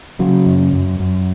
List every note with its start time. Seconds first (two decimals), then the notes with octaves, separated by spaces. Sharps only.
0.19 C#3 F#3
0.46 F#2
0.73 F#2
1.00 F#2